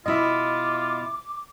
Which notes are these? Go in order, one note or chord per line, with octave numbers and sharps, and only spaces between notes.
B2 E4 F4 D#5 E5 D6